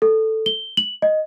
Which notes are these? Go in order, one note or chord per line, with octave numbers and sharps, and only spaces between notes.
A4
G7
F#7
D#5